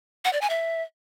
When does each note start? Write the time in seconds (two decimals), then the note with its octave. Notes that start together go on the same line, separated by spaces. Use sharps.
0.25 F#5
0.33 D5
0.41 G#5
0.50 E5